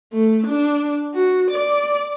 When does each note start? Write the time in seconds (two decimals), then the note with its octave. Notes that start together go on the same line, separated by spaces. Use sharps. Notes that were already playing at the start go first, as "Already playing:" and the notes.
0.13 A3
0.47 D4
1.14 F#4
1.51 D5